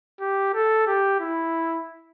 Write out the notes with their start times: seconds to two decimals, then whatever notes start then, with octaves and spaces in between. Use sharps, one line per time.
0.20 G4
0.54 A4
0.87 G4
1.20 E4